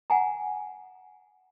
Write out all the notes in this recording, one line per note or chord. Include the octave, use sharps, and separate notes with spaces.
F#5 G#5 A#5